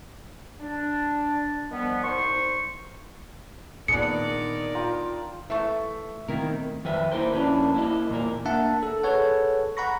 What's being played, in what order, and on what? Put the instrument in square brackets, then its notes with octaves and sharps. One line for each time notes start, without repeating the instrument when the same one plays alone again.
[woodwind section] D4
D#3 F3 G3 B3
C2 D#4 C5 C6 C#6
[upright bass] A#2 [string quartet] D#3 D5 [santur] B3 D4 G#4 [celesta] C#7
[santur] F4 G5 A#5
[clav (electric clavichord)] E3 A3 A5 [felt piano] E5 C#6
[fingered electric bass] B2 A3 C4 [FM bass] D#3 [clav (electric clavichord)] A#3 E4 A#4
[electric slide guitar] F2 D#3 B4 E5
A#3 D#4 E4 A#4 C5
F2 A#3 C#4 D4 E4 B4
A#3 E4 D#5
E2 A#2 F3 A#3 A#4
[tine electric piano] A#3 D4 A#4 E5 F#5 A5
A4
G#4 A4 B4 C#5 F#5
F#5 A#5 B5 C#6 A#6